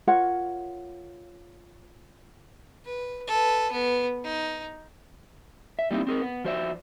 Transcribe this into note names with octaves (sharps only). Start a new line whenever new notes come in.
F4 A#4 C#5 F#5
B4
A4 B4
B3
D#4
E5
G3 A#3 C4 D#4 E4
C4 G#4 A#4
B3
F3 F#4 C5 D5 E5